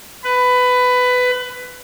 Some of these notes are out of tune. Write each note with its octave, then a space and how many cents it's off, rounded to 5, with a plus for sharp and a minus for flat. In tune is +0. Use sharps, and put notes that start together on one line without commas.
B4 +15